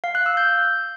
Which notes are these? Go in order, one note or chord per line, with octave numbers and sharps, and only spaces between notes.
F5
F#6
E6
G6